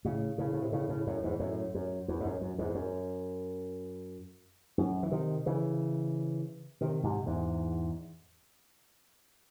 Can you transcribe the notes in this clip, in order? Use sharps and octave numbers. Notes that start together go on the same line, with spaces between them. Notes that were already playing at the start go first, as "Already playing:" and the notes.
A2 C#3
A2 C#3
A2
C3
A2 C#3
A2 C#3
F#2 A2
E2 G#2
F#2 A2
F#2
E2
G#2
F#2
F#2
E2 G#2
F#2
F#2
E3
C3 D#3
C#3 E3
C3 D#3
G#2 C3
E2 G#2